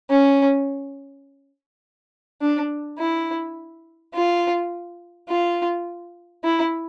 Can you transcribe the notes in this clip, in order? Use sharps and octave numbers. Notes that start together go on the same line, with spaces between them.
C#4
D4
E4
F4
F4
E4